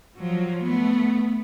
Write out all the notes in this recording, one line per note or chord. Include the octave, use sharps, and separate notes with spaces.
F3 F#3
A3 B3